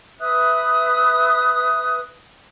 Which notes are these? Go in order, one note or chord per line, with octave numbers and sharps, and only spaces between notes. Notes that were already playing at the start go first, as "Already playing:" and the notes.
B4 E5 D#6 F#6